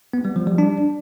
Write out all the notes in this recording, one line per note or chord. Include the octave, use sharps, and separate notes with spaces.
B3
G3
F3
G3
D4